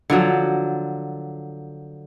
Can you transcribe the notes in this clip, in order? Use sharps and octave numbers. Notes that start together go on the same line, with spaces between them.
D3 F3 F#3